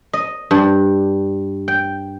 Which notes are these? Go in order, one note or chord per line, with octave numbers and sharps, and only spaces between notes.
D#5
G2
G5